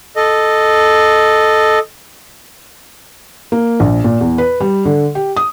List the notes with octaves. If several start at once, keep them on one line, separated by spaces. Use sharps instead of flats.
A4 D#5
A#3
A#1
A#2
E2
B4
G3
D3
G4
D#6